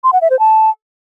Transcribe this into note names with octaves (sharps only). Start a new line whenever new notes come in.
C6
F#5
E5
C5
A5